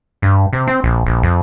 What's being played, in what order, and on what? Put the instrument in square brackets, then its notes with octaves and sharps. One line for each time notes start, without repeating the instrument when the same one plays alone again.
[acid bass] G2
C3
C4
A#1
A#1
F2